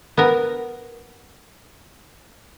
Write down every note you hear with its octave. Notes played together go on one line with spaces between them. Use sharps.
B3 A#4